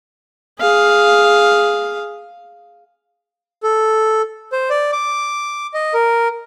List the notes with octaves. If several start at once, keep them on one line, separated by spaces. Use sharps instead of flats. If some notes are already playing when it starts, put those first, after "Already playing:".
G#4 F5
A4
C5
D5
D6
D#5
A#4